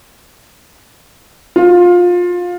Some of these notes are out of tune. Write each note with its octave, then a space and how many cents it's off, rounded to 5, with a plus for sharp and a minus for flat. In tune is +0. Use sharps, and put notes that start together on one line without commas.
F4 +20